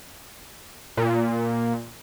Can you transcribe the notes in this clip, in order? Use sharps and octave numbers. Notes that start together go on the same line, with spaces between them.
A#2